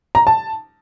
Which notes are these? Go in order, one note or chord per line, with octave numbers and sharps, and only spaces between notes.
A#5
A5